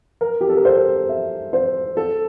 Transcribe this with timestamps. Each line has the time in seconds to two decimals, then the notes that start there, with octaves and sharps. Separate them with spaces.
0.21 A#4
0.41 G4
0.49 A4
0.57 A#4
0.65 C5
1.09 E5
1.53 C5
1.97 A4